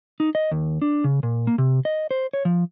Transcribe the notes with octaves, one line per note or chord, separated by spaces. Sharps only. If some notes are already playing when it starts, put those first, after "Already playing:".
D#4
D#5
D#2
D4
C#3
A#2
A#3
C3
D#5
C5
C#5
F3